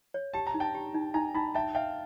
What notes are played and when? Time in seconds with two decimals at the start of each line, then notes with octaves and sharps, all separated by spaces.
0.14 C#5
0.34 G4 A5
0.47 A#5
0.54 D#4
0.60 G5 A5
0.75 G4
0.94 D#4
1.14 D#4 G#5 A#5
1.34 D#4 A5 B5
1.55 E5 G5 A5
1.75 E5 F5 G5